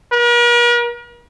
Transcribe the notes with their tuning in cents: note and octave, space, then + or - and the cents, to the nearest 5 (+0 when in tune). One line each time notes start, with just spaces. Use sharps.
A#4 +45